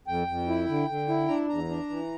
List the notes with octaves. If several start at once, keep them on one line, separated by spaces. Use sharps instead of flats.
F2 G5
F2
E4
D3
D3
E4
D4 A#5
E2 A#5
D4
E3